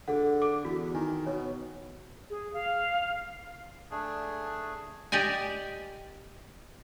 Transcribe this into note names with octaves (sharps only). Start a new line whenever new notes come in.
D3 G#4 A4 F#5
A4 D6
E2 F#4
D#3 G#5
B2 C#5
G#4
F5
A3 D4 G#4
G4 D5 D#5 G#5